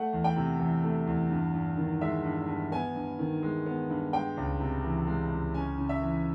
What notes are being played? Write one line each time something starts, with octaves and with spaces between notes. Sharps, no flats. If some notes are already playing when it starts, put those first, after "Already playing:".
Already playing: A3 F#5
E2
G5
C3
E3
A3
E2
G2
G2
D#3
G#3 E5
G2
G2
B3 G#5
G2
D#3
G#3
B3
G2
G#3 G5
C#2
C3
E3
G#3
C#2
C#4 G#5
C#3
E5
E3